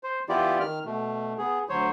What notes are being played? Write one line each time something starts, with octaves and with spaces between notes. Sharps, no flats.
C5
E3 B3 E4 F4 G4 D5
D#3 F6
B2 A3
B3 G#4
D2 F#3 C5 C#5